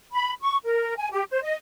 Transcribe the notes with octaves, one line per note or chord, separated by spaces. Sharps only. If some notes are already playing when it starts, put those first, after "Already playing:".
B5
C#6
A#4
G#5
G4
C5
D#5